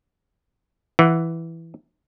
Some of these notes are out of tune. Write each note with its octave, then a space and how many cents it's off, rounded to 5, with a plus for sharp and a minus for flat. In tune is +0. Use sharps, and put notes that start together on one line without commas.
E3 +0 F#5 +0